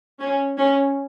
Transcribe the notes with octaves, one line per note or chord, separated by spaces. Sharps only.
C#4
C#4